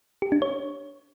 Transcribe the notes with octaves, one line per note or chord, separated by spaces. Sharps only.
G4
D4
C#5